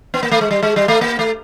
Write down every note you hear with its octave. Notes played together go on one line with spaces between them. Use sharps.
B3
A#3
A3
G#3
G3
G#3
G3
A3
A#3
A3